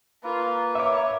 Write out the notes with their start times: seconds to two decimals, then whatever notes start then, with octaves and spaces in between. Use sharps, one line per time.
0.24 A#3 F4 A#4 B4
0.75 A#4 C#5 E5 D6